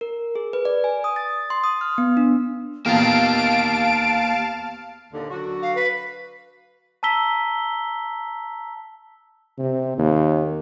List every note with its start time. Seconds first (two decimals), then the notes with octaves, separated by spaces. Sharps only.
0.01 A#4
0.35 G#4
0.53 B4
0.65 D5
0.84 G#5
1.04 D#6
1.16 A6
1.50 C6
1.64 D#6
1.81 F6
1.98 B3
2.17 D4
2.86 E2 A#2 A#3 G4 F5 A5 D7
5.13 D#2 A#2 D3
5.30 D3 F#3 F#4
5.62 F5
5.75 B4
7.03 A5 A#5 E6 B6 G7
9.58 C3
9.98 D#2